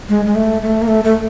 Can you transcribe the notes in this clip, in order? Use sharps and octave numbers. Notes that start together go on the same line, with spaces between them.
G#3
G#3
A3
A3
A#3
A3
A3